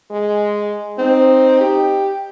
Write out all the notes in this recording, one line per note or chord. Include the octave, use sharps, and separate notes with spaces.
G#3
C4 D#4
G4